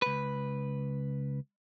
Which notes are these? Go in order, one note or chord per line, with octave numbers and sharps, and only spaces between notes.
C#2 B4